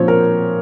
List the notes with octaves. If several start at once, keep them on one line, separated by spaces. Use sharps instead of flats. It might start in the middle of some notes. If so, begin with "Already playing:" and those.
Already playing: A#2 F3 C4 C5 C#5
A#4